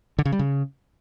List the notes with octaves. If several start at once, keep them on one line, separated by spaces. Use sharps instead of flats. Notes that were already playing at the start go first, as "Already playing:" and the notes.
D3
C#3
G3
C#3